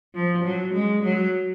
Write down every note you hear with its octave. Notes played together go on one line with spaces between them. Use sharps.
F3
F#3
G#3
F#3